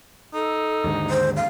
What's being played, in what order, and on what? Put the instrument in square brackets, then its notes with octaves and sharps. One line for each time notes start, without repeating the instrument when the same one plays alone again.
[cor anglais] D#4 [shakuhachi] A4
[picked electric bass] D#2 G#2 D3
[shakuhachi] C5
F5